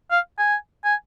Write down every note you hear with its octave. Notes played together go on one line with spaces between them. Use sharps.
F5
G#5
G#5